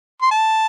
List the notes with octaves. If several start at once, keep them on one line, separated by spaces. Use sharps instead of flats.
C6
A5